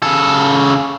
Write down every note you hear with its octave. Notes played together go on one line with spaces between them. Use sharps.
C#3 A4